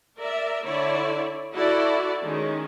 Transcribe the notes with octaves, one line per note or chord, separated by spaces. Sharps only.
A#4 D5 E5
D3 E4 C#5 D5
E4 F#4 A4 D5
D#3 G#3 C#4